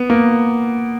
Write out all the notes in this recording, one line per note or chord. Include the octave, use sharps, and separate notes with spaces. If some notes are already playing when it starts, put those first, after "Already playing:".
Already playing: B3
A#3